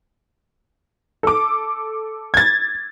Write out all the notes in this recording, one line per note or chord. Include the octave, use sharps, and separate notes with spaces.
A4 D6
G#6 A6